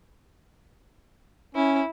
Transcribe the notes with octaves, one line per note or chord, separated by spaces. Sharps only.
C#4 E4